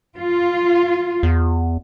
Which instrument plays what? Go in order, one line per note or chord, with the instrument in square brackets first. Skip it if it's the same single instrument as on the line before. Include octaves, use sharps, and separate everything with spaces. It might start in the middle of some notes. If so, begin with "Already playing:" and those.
[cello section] F4
[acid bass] E2